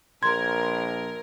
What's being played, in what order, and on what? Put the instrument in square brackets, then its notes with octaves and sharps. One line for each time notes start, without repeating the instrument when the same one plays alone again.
[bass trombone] A#1 [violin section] A#4 [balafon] C6 [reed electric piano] G#6